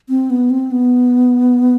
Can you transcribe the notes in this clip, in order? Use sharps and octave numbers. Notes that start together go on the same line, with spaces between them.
C4
B3
C4
B3